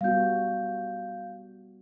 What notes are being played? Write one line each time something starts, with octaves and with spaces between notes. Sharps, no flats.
G3 B3 F#4 F5 G6